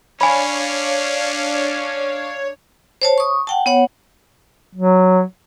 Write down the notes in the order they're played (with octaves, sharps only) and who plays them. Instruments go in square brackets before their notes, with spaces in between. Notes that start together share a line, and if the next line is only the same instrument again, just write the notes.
[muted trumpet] C#4 [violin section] D4 D5 F5 [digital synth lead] C#5 [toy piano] G#5 B5
[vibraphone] C5 C#5 A5
C#6 D#6
F#5 G5 A5
B3 C#5 F#5
[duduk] F#3